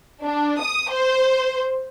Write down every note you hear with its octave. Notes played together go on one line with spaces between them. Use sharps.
D4
D#6
C5